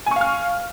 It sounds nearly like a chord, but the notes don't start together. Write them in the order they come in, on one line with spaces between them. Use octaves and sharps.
G#5 C#6 F5 F6